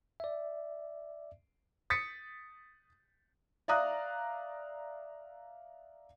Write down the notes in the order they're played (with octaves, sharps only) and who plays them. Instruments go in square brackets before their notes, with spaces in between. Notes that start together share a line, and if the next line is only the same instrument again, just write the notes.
[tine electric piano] D5 E5
[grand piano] D#6 A6 B6 C#7
[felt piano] D5 E5 F5 A#5 D#6 F#6